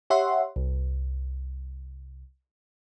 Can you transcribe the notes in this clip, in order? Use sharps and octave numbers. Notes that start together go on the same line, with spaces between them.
G4 C#5 E5 F#5 C6
C2